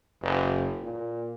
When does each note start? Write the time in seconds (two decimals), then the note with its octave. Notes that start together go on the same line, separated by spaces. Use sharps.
0.22 F#1
0.82 A#2